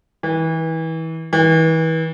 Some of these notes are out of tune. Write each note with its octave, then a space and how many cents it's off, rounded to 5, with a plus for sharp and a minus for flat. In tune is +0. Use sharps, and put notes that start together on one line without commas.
E3 -30
E3 -35